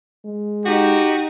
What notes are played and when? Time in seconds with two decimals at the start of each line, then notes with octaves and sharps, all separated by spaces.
0.25 G#3
0.66 D#4 F#4 G4